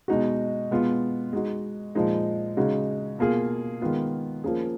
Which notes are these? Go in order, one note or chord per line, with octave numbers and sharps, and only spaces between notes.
B2 G#3 D#4 F#4
B2 G#3 B3 F4
G#3 D#4 F#4
A#2 F3 G#3 D#4
C#3 G#3 D#4 F#4
B2 A#3 F4 G#4
D#3 G#3 B3 F4
F3 A#3 C#4 G#4